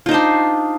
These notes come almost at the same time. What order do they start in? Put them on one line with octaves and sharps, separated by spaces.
F4 D#4 C5 D4